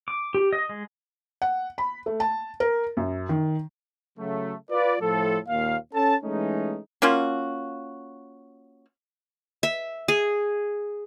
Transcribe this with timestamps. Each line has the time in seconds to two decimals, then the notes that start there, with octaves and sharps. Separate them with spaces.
0.08 D6
0.34 G4
0.53 D#5
0.69 G#3
1.42 F#5
1.78 B5
2.06 A3
2.20 A5
2.60 A#4
2.97 F#2
3.29 D#3
4.18 C#3 F#3 A3
4.71 F4 B4 D5
5.01 A2 F3 A4
5.48 D#2 A#2 A#3 F5
5.94 C#4 A4 A5
6.24 E3 G#3 A3 C#4 D#4
7.02 A#3 C#4 F4 F#4
9.63 E5
10.08 G#4